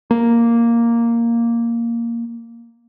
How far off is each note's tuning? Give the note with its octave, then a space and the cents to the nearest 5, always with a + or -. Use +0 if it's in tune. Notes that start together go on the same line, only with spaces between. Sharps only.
A#3 +0